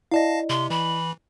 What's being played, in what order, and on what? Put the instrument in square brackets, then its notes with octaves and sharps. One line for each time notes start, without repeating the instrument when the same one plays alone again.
[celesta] E4 D5 D#5 [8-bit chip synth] F5 A5 A#6
[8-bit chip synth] C3 [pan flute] C6
[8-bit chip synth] E3 [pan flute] B5